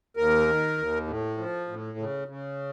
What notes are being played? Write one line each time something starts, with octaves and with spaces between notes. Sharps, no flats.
D#2 A#4
D#3
D#2
A2
F3
A2
C#3
C#3